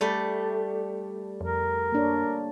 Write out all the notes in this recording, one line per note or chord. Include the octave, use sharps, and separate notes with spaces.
G3 A3 D5
F2 A#4
A#3 D4 C#5